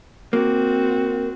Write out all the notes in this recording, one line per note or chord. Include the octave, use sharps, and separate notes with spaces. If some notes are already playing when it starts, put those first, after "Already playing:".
A#3 C4 F#4